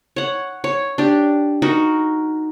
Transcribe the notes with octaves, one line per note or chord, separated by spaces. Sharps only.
C#5 F#5
C#5
D4 G4
D#4 F#4 A#4